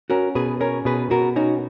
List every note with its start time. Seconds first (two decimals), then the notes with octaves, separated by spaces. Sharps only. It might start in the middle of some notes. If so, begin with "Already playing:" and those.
0.10 C#4 F#4 A#4
0.35 B2 G#4 B4
0.60 C#4 A#4 C#5
0.85 B2 G#4 B4
1.11 B2 F#4 A#4
1.36 C#4 D#4 F#4